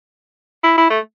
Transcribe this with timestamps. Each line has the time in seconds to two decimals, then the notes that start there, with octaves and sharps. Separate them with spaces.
0.63 E4
0.78 E4
0.90 A3